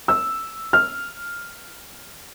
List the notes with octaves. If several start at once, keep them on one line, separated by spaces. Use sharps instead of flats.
E6
F6